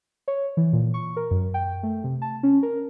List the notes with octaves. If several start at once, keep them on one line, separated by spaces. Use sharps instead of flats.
C#5
E3
A#2
C#6
A#4
F#2
G5
A3
C3
A5
C#4
A#4